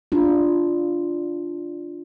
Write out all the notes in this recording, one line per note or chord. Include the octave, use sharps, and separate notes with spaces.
D4 F4